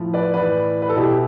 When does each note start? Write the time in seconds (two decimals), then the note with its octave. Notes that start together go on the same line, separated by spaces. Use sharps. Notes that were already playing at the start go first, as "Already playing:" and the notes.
Already playing: A2 F3
0.14 B4 D5
0.34 A2 E3 B4 D5
0.82 B4
0.89 A4
0.96 B2 E4 G4